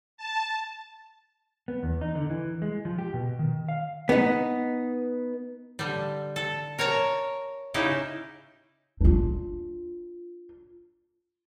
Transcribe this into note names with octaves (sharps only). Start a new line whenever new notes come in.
A5
B3
E2
D#4
D3
E3
G#3
F3
G4
B2
D#3
F5
B3 D#4
D3 G3
A4
A#4 C#5 A5 A#5
C#3 D#4 E4 G4
D4 F4